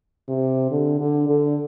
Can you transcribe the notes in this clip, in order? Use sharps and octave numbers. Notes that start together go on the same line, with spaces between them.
C3
D3
D3
D3